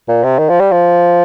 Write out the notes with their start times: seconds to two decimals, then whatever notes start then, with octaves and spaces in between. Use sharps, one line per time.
0.08 A#2
0.24 C3
0.38 D#3
0.49 F3
0.60 G3
0.72 F3